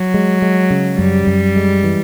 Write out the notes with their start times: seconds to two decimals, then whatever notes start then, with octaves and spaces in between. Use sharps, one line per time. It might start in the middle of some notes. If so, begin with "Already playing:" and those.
Already playing: F#3
0.14 G#3
0.42 G#3
0.70 C#3
0.98 F#2 G3
1.27 F#2
1.56 G#3
1.84 E3